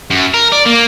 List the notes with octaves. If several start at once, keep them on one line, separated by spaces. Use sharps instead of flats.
F#2
A#4
D5
A#3